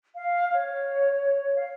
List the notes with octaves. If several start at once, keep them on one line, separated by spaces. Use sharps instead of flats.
F5
C#5
F5